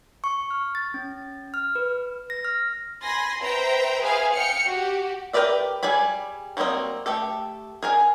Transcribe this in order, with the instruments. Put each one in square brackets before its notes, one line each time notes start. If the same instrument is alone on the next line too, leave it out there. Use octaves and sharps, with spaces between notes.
[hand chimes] C#6
F6
A6
C#4
F6
B4
A#6
F6
[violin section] G#5 B5 C6 A#6
B4 C5 E5 G5 A#5
G#4 B4 C5 E5 F5
F5 G5 F6 C#7
F#4 G4
[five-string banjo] G4 A#4 B4 D5 E5
G3 G#4 D5 G#5 B5
F#3 G3 A#3 C4 D#5
A3 G4 A4
G#4 A#4 G#5